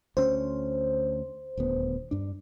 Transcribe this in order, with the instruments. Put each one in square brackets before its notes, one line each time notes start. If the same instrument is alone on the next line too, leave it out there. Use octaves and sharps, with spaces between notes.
[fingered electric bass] D2 C#4 [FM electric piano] C5
[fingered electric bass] D#1 D2 B3
G2 D4